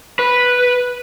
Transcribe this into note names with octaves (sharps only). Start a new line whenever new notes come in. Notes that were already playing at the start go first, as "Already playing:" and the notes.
B4